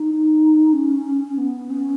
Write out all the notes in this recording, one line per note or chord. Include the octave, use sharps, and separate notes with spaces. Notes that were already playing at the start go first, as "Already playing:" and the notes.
Already playing: D#4
C#4
B3
C#4